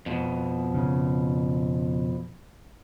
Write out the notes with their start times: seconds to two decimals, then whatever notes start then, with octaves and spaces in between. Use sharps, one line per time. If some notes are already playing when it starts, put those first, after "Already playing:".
0.06 F2 B2
0.74 C#3